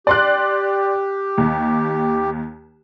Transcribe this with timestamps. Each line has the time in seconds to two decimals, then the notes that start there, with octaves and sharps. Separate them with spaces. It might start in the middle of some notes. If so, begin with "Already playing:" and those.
0.07 G4 D5 C6 F#6
1.38 D#2